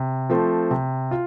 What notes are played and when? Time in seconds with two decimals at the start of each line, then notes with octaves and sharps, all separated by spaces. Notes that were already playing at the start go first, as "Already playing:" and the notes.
Already playing: C3
0.30 F3 A3 C4
0.71 C3
1.11 F4